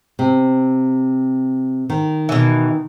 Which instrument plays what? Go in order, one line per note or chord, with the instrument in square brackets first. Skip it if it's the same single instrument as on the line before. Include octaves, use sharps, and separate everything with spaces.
[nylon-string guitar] C3
D#3
[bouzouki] B2 E3